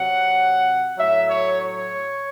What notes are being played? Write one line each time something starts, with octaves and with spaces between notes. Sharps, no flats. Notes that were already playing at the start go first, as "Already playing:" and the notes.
Already playing: C3 F#3 F#5
A2 F#3 E5
C#5
C#5